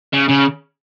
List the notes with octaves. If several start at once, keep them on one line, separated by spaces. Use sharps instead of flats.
C#3
C#3